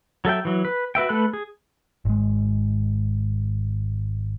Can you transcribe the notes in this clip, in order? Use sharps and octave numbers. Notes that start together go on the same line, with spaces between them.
F#3 A4 E5 G5
E3 F#3
B4
F#4 B4 E5 G5
A3 A4 B4 B5 F#6
G#4
G#1 G#3